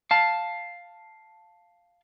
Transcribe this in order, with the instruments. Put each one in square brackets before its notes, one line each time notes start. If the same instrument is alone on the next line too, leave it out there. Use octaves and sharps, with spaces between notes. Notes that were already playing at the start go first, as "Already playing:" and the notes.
[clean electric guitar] F5 A5